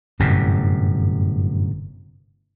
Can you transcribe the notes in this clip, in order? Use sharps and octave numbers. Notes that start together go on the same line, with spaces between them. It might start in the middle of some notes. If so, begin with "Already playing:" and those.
G1 F#2 A2 C3